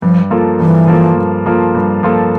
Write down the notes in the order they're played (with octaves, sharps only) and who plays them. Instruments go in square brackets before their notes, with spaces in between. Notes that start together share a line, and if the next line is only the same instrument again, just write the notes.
[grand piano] G2 [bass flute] F3
[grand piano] F3 A#3 F4 A4
[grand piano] G2 [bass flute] E3
[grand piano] F3 A#3 F4 A4
G2
F3 A#3 F4 A4
G2
F3 A#3 F4 A4